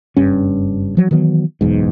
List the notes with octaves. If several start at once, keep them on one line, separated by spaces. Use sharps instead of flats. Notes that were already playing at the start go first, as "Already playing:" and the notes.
F#1 G2 C#4
F3 F#3
D#3 E3 F#3 B3
F#1 B1 E2 G#2